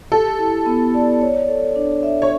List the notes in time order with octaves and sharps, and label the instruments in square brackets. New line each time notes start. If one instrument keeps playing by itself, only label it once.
[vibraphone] G4 [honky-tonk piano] A4
[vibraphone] E4
B3
D5
C#5
A4
D4
E5
[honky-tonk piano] C#5